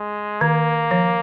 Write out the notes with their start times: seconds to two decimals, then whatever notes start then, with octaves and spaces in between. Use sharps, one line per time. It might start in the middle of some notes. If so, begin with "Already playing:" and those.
Already playing: G#3
0.41 D#3 A#3
0.91 F3